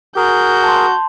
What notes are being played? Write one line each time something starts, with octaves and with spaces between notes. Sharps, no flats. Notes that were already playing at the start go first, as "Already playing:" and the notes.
F#4 G#4 A#4 G6
A5 C6